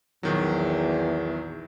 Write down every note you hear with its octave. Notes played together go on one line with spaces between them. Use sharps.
A#1 E2 D#3 F#3